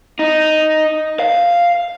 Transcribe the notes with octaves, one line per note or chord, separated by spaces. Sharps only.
D#4
F5